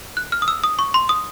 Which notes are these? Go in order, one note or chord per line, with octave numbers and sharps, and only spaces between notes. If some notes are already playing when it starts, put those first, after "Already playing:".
F#6
F6
D#6
E6
D#6
C#6
C6
D#6